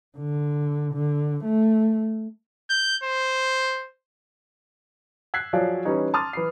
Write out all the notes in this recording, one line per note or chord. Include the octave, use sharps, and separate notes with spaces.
D3
D3
A3
G6
C5
E6 F#6 G#6 B6 C7
F3 F#3 G#4 C#5 D5 F5
E3 G3 C#4 D#4
A5 C6 D6 D#6 F6 A6
E3 B5 C7